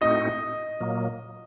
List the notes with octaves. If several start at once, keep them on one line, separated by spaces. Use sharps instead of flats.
A2 A3 C4 D#4 F#4 D#5
A#2 F#3 A#3